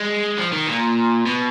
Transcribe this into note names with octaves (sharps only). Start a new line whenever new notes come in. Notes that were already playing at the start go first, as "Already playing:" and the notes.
Already playing: G#3
F3
D#3
A#2
B2